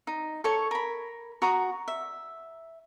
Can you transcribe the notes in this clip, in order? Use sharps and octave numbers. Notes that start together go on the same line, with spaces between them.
D#4
A4 C#5 C#6
A#4 B5
F#4 A#5 C#6 D#6
E5